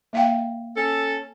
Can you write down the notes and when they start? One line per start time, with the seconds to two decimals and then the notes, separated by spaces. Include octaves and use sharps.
0.13 A#3 F5 G5
0.74 C#4 A4